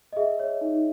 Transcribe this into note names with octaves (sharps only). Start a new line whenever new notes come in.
D#5
G#4 E5
C#5
D#4